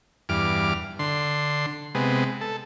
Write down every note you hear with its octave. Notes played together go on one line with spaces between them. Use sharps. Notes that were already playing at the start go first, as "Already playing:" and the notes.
E2 G2 D6 F6
D3 C6
C3 G#3 B3
A4